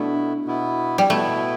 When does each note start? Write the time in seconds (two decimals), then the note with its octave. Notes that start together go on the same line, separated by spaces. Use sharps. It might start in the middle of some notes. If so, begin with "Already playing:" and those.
Already playing: B2 A3 B3 D4 E4
0.46 B2 B3 E4
0.98 G3
1.10 B2 A3 B3 E4